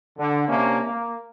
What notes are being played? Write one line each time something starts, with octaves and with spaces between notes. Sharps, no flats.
D3
C3 A#3 C#4 D4
A#3